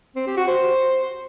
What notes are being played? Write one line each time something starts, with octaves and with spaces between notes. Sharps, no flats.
C4
G4
F#4
C5